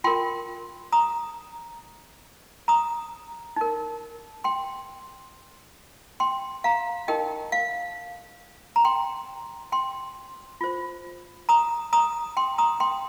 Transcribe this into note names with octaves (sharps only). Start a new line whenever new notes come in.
F4 A#4 G5 C6
A#5 D#6
A#5 D#6
D#4 A#4
G5 C6
G5 C6
F5 A#5
D#4 G4 A#4 D#5 G5
F5
A#5
G5 C6
G5 C6
F4 C5
A#5 D#6
A#5 D#6
G5 C6
A#5 D#6
G5 C6